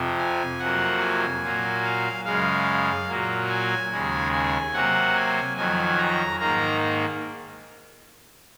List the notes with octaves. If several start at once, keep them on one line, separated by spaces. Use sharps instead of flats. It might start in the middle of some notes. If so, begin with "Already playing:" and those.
Already playing: F2 C3 F3
G#5
F2 C3 F#3 A#3 F#5
G#5
A#2 F#3 A#3
F5
F#2 C#3 G#3 F5
A#2 F#3 A#3
G#5
D#2 C#3 G#3
G#5
C3 F#3 A#3 F#5
G#5
F2 D#3 F#3 G#5
A#5
G#2 D#3 A#3 A#5